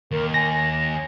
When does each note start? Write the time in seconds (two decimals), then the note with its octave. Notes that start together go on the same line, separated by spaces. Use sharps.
0.11 D#2 A#4
0.34 G#5 A#6